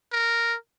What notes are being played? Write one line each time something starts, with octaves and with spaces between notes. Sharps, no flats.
A#4